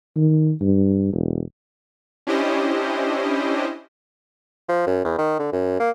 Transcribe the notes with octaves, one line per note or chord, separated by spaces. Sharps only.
D#3
G2
E1
C#4 D4 E4 G4 C5 D#5
F3
F#2
E2
D#3
D3
F#2
A#3